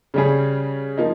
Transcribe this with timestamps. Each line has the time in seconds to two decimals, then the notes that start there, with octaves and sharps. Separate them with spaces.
0.14 C#3 G3 C#4 G#4
0.97 F3 A#3 D#4